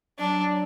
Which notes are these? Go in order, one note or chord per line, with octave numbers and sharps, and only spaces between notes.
F#3 D4